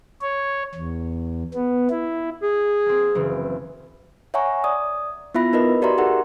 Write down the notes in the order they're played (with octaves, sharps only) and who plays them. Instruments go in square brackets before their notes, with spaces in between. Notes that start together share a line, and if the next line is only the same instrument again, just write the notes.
[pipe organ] C#5
E2
B3
E4
[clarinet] G#4
[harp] A#3 C4
F#1 E3
[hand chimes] C#5 E5 F#5 G#5 A#5 C#6
D5 D#6
B3 E4 F4 E5 B5 A#6
D#4 A#4 B4 D#5 B5
F#4 G4 D5 E5 A#5 C6
D#4 G4 G#4 A#4 F#5